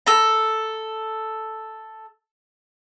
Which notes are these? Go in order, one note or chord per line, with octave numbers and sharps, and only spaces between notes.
A4 A#5